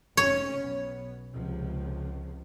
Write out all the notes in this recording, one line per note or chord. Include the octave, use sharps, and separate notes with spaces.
F1 C#4 C#5
B1 B3
C#2 C3 F3